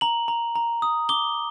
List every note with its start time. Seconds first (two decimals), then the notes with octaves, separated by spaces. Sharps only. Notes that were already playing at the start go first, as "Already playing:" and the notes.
0.01 A#5 F#7
0.28 A#5
0.56 A#5
0.82 D#6
1.09 D6 G7